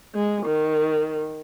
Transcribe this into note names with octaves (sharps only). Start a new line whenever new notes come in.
G#3
D#3